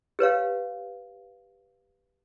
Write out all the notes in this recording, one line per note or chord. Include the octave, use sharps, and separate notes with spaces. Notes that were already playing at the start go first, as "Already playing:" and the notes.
G4 B4 C#5 F5